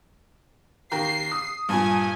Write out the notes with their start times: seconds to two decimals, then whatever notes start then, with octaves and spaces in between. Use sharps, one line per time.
0.92 D#2 G4 A#4 C7
1.32 D#6
1.69 G2 A#2 G#5